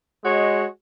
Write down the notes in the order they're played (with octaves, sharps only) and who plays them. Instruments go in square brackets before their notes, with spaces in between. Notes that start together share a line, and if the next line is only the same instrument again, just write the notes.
[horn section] G#3 F#4 C#5 D#5